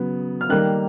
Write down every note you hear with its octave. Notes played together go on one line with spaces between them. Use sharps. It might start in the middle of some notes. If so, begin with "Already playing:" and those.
Already playing: C#3 F#3 B3
F6
D#3 G3 A#3 F#6